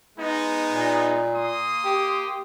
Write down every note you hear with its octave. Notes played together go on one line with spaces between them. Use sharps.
G#3 B3 D#4
A#2
A#3 C6 D#6
G4